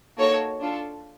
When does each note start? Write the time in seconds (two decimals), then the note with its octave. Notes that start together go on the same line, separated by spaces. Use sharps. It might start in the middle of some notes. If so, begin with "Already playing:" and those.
0.18 A#3 D#4 F#4 A4 C#5
0.59 D4 F4 A4